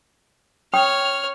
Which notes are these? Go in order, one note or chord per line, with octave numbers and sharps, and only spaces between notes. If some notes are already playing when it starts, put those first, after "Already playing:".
C#4 C#5 G5 D#6 F6